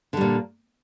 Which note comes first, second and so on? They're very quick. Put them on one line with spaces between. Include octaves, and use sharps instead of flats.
D3 G3 A#2